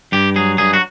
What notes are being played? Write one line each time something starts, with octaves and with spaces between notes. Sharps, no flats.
G2 G4
F#3 G#4
G2 G#4
F#4